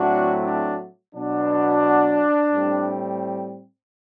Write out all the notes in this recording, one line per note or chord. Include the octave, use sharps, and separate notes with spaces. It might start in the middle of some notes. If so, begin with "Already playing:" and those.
Already playing: A2 F#3 A3 C4 D4 F#4
D4
B2 F#3 B3 D4
A2 G3 C4